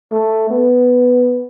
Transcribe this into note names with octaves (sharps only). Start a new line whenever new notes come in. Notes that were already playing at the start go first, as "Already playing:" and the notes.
A3
B3